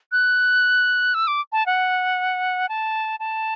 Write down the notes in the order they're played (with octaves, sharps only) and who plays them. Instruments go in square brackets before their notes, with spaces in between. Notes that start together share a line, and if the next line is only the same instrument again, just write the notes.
[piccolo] F#6
E6
D6
A5
F#5
A5
A5